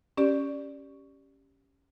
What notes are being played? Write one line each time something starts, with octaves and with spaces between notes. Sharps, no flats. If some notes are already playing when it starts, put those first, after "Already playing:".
C#4 G4 D5